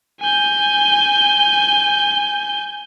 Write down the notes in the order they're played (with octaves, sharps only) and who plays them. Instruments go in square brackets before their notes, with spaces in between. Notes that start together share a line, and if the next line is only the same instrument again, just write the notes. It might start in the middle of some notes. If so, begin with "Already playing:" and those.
[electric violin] G#5 G6